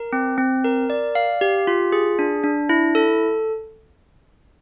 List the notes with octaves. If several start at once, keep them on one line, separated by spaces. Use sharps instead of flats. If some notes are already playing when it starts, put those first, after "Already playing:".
Already playing: A#4
C4
C4
A#4
D5
F5
G4
F4
G#4
D4
D4
E4
A4